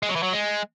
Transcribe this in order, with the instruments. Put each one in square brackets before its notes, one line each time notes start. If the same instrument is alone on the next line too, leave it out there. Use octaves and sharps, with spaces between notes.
[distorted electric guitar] G#3
F#3
E3
F#3
G#3